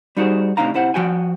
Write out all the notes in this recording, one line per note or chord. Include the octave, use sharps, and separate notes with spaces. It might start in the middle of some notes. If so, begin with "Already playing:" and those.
G3 D#4 F#4 G#4 C5
A2 C3 D4 D#4 F5 A#5
C3 E4 C5 F#5
F3 F#4 G5 G#5